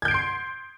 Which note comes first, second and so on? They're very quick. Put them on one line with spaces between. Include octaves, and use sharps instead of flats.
G#6 G6 D7 C7 C6